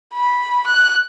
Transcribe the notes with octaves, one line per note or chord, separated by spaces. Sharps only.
B5
F#6